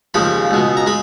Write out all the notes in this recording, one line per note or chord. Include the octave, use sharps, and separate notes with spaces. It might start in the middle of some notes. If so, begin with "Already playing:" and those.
D#2 C#3 F3 G#3 B5
C#2 B2 G#3
A#5
G#3 B5